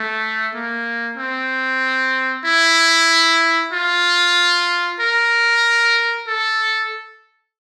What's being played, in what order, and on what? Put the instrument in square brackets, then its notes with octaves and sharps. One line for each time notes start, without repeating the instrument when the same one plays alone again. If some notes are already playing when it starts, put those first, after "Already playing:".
Already playing: [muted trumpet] A3
A#3
C4
E4
F4
A#4
A4